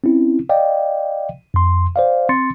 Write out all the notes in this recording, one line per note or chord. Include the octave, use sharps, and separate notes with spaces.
C4 C#4 E4
D5 D#5 F5 G5
F2 C6
C5 D5 F5
C4 C6 A6 C#7